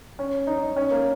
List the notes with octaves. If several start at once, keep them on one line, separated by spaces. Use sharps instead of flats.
C#4
D#4
C#4
A#3